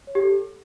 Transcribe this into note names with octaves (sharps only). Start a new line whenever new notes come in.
C#5
G4
A4